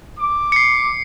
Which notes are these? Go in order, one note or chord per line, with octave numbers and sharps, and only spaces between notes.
D6
C7 C#7